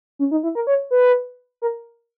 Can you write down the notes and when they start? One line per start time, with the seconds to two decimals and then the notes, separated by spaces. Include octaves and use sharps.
0.19 C#4
0.31 D#4
0.43 E4
0.55 A#4
0.67 C#5
0.91 B4
1.62 A#4